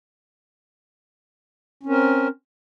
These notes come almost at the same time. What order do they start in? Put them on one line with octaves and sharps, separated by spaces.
C#4 C4 A#4